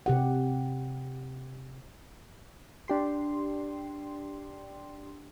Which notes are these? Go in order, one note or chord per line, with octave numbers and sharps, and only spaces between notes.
C3 G4 F#5
D4 G4 C6